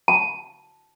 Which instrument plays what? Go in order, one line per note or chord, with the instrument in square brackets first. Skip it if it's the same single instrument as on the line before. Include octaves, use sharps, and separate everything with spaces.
[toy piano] A5